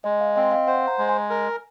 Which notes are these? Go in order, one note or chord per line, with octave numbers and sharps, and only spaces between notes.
G#3 D#5
F5
C4 D#5
F5
C5 F#5
A#5
G#3
G#5
A#4